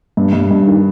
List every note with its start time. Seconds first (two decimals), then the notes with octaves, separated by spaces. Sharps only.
0.17 G2
0.33 G2
0.51 G2
0.67 D#3